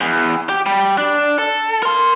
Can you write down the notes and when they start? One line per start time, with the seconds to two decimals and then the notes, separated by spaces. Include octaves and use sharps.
0.01 E2
0.49 G4
0.66 G3
0.98 D4
1.38 A4
1.83 A#4 C6